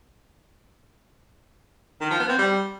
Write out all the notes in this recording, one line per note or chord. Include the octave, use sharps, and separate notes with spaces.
D#3
F3
B3
C4
G3